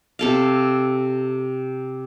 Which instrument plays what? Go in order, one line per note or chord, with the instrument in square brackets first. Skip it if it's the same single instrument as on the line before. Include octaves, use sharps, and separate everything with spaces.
[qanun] C3 A4 F5